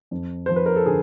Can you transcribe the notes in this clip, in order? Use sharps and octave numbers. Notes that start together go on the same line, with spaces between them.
F2
F3 C5
B4
A#4
A4
D3 G#4